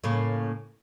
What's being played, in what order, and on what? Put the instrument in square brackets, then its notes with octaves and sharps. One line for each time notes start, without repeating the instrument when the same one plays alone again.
[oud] A2 C#3 A#3